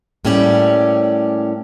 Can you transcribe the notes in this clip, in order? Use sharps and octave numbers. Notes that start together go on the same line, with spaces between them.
A2 G3 A#3 C#4 C#5 D5